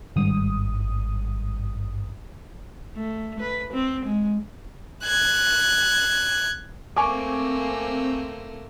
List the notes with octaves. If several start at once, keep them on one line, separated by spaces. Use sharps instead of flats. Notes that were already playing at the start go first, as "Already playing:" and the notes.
G#1 G2 D#6
A3
B4
C4
G#3
F#6 G#6
A3 A#3 C4 G#5 C#6 D6